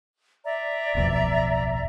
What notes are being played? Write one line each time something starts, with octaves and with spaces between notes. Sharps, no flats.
D5 E5 A#5
D1 B1 F2